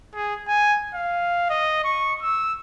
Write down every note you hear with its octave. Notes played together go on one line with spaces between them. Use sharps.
G#4
G#5
F5
D#5
C#6
E6